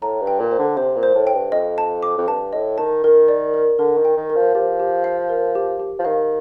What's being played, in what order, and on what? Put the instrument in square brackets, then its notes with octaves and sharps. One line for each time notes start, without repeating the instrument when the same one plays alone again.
[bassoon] A2 [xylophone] A#5
[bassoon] G2
[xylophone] G5
[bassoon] A#2
[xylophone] C5
[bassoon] D3
[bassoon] C3 [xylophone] C5
[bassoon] A#2
[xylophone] C5
[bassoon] A2
[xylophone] G5
[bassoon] G2
[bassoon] F2 [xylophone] D#5
[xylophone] A5
D6
[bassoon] F2
[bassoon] G2 [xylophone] A5
[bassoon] A2 [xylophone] D#5
[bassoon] D#3 [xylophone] A5
[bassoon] D#3 [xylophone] A#4
[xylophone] D5
A#4
[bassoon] D3 [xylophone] A#4
[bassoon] D#3
[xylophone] G5
[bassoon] D#3
[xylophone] A#4
[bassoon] F3
[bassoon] F3 [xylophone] G4
[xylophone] G4
F5
A#4
G4
G4
[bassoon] F3
[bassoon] D#3 [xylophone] F5